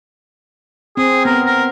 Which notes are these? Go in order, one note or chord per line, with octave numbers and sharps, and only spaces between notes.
C4 G#4
B3 A#4
A#4